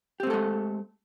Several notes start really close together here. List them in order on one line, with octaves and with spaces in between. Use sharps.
G4 C4 A3 A4 G#3